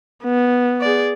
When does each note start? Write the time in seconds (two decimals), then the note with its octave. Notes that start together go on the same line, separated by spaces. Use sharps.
0.24 B3
0.81 G#4 D5